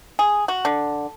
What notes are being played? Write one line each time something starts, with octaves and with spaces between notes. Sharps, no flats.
G#4
F#4
D3